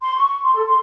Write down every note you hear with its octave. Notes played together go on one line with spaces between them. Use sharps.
C6
C#6
C6
A4
C6